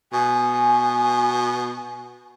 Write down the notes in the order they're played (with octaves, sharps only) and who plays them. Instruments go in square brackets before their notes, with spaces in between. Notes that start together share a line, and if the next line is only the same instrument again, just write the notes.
[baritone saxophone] B2 [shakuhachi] G#5